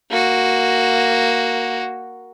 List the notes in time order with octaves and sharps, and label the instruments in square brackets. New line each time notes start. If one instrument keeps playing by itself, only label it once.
[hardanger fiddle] A#3 F#4